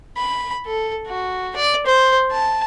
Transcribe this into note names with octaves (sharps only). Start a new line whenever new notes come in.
B5
A4
F#4
D5
C5
A5